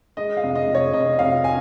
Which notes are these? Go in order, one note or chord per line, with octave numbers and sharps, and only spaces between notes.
G#3 D#5
F5
F1
D#5
F1
C#5
F1 D#5
F1 F5
G#5